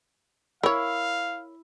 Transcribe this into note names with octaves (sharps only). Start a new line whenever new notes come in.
E4 A#4 C#5 F5